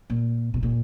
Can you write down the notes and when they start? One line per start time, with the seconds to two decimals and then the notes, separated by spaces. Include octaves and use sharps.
0.10 A#2
0.54 B2
0.63 A#2